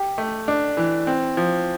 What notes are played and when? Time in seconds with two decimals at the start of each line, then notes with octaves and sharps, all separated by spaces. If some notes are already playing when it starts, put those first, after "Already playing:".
Already playing: G4
0.18 A3
0.48 D4
0.77 E3
1.07 C4
1.37 F3